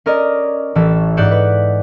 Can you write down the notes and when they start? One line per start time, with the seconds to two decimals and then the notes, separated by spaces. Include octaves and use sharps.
0.06 C#4 A#4 D5 D#5
0.75 A1 E3 C#4 A5 E6
1.17 G#2 G#3 D5 F#5 G6 E7
1.31 B4